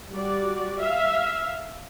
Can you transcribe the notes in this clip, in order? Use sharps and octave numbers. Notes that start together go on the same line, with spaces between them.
G3 F#4 D5
E5 F5